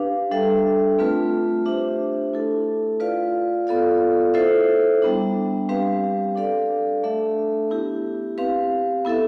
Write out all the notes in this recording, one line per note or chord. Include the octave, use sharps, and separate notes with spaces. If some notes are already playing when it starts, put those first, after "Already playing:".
Already playing: D4 G4 B4 F5
G3 D4 A4 E5
A3 C4 F4 B4
D4 G4 C5 E5
A3 E4 A4
F4 B4 D5 F5
B3 F4 A4 D5 F5
E4 A4 C5 E5
G3 B3 D4
G3 C4 G4 B4 F5
D4 A4 D5 F5
A3 D4 A4 E5
B3 E4 G4
C4 G4 B4 F5
B3 E4 A4 E5